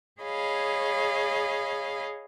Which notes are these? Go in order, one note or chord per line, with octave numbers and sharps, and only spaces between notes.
G#4 C#5 D#5 F5 B5